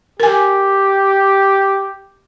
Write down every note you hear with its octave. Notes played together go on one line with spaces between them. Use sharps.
G4 A#4 G#5